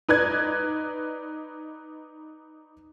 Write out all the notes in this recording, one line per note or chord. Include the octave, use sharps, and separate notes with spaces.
D#4 B4 D5 F#6 G#6